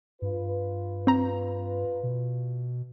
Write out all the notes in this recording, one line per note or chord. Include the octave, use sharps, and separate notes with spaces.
G2 F4 B4
C4 A#5
B2